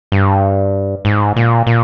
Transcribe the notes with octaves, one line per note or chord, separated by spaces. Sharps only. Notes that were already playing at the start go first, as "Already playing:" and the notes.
G2
G#2
A#2
A#2